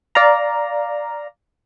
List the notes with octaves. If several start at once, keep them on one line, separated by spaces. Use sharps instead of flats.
D5 F5 A#5